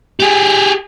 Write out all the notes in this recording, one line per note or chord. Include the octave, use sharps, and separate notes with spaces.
G4 G#4